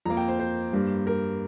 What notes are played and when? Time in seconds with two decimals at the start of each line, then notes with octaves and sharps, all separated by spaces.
0.06 F2 F3 A#3 A#5
0.17 G5
0.28 C5
0.39 C5
0.73 G2 G3 A#3
1.07 A#4